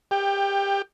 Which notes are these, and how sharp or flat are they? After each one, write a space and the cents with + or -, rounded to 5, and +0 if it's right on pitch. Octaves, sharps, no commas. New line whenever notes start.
G4 +25 G5 +10